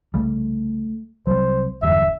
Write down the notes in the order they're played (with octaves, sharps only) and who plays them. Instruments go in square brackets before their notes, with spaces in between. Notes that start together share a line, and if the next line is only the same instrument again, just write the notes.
[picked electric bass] C2 C#3 G3 [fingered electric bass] A3
[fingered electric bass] C2 C3 [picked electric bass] F#3 G3 [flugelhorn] C5
[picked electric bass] F1 G2 [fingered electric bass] E2 D3 F#3 [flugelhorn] E5